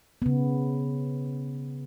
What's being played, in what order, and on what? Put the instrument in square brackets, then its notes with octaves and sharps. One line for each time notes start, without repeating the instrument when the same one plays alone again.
[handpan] C#3 B3